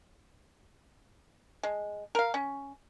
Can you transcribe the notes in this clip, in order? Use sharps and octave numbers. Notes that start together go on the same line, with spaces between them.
G#3
A#4 F5
C#4